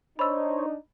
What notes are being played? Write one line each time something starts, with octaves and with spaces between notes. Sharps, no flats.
D4 D#4 C5 C#5 B5 E6